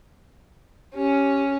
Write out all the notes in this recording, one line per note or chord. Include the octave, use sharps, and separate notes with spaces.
C#4 G4